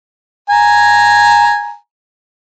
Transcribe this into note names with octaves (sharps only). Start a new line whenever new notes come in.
G#5 A#5